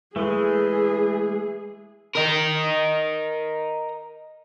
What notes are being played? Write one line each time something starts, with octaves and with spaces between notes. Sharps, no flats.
E3 G#3 A3 G#4
A#4 D#5